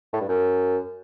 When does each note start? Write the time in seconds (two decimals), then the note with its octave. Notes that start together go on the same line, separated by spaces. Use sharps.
0.13 A2
0.21 G2
0.29 F#2